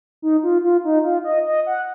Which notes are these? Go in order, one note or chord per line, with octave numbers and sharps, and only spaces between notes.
D#4
F4
F4
D#4
F4
D#5
D#5
F#5